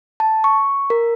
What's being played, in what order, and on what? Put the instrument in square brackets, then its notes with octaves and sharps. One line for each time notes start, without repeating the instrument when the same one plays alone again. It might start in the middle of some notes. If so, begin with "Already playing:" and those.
[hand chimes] A5
C#6
A#4